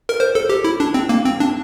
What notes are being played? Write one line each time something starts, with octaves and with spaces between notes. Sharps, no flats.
A#4
C5
A4
G4
E4
D4
C4
A#3
C4
D4